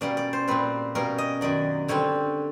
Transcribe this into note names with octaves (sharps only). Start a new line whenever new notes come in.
B2 G3 A#3 C#4 D5
D5
C5
A#2 G3 C4 B4
B2 G3 A#3 C#4 A#4
D#5
F#2 D#3 F#3 D5
D3 G3 C4 C#5